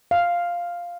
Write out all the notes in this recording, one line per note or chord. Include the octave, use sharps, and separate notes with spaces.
F5